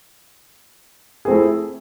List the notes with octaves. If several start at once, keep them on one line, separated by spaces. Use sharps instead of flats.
A3 C4 E4 G#4